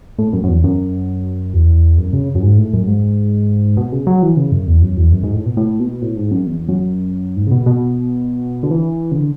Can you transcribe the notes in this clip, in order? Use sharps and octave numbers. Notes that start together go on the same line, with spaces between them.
A2
F#2
F#2
E2
F#2
E2
F#2
C#3
F#2
G#2
A2
F#2
G#2
B2
C#3
F#3
E3
C#3
F#2
E2
F#2
E2
F#2
G#2
A2
B2
A2
B2
A2
G#2
F#2
E2
F#2
G#2
C#3
B2
B2
D3
E3
C#3
D3